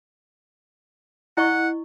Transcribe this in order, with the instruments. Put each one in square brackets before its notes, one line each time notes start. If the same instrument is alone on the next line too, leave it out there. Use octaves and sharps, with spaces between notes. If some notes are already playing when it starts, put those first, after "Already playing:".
[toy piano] E4 D#5 C#6 [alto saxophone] F#5